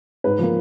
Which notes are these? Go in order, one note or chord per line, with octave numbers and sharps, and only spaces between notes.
G#2 B4
F3 A#3